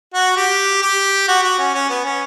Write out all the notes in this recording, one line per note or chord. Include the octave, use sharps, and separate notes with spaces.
F#4
G4
G4
F#4
F#4
C#4
C#4
B3
C#4